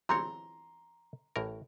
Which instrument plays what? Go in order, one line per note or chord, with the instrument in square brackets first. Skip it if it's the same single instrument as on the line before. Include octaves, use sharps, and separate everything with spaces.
[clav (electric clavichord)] E3 C4 C#5 [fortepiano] A#5 C6
[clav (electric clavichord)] A1 A2 A#4